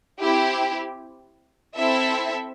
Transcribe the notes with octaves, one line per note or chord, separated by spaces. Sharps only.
C4 E4 G4
C4 E4 A4 E5